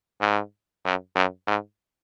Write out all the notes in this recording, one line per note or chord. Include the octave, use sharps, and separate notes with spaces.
G#2
F#2
F#2
G#2